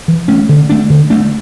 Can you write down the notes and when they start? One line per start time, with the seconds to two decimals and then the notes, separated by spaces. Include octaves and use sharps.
0.08 E3
0.28 A3 C#4
0.49 D3
0.69 A3 D4
0.90 D3
1.10 A3 D4